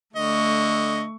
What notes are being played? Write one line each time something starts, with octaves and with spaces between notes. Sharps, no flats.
D3 A3 D#5 C#6